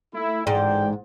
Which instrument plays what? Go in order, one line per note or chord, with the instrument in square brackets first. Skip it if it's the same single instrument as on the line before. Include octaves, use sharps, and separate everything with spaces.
[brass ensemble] A3 E4
[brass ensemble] A1 D5 G5 [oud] G#2